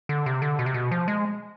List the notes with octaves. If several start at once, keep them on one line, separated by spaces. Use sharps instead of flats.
D3
C3
D3
B2
C3
B2
F3
G#3